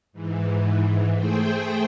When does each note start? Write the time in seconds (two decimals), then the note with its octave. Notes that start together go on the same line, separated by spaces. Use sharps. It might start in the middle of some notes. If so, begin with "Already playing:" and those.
0.12 G#2 E3
1.14 A3 G#4 C5 G5